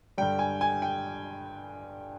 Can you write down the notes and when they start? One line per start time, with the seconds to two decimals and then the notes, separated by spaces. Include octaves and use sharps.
0.18 G2 D3 G3 G5
0.39 G#5
0.61 G#5
0.82 G5